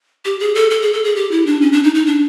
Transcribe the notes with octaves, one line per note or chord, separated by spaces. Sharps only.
G4
G#4
A4
A4
G#4
A4
G#4
G4
E4
D4
C#4
D4
D#4
D#4
D4